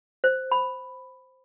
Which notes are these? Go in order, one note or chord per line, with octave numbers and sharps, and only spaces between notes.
C5
B5